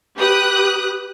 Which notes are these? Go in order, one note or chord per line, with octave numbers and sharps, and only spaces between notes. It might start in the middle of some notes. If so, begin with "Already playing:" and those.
G4 B4 D#6 F#6